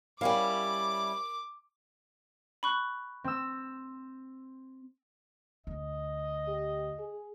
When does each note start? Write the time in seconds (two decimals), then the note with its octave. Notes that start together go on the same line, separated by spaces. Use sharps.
0.21 G3 C#4 E4 A#4 C#5 F5 D6
2.63 B5 C#6 F#6
3.24 C4 E6
5.67 D2 D#5
6.48 G4
6.99 G#4